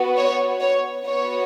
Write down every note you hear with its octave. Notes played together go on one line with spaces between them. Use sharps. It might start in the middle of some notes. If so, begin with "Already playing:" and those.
Already playing: B3 F#4
C#5
C#5
B3 F#4 C#5